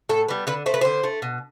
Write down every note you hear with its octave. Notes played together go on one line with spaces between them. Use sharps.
A2 A4
G3 B3
D3 B4
A3 C5
B4
D3 C5
A3
B2